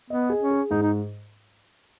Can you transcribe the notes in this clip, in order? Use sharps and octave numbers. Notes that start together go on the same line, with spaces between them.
B3 D#5
G#4
C#4
G#4
G#2 D#4
D#4